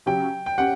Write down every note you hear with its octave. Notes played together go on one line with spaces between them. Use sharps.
C#3 F#3 C#4 G4 G5
G5
C#4 G4 F#5